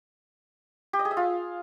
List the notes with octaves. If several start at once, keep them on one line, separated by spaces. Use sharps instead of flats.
G4
D#5
G#4
E5
F4